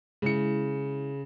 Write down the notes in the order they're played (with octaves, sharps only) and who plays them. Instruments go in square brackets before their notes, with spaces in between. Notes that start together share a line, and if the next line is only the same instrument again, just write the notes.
[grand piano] C#3 C#7 [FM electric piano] G#3 E4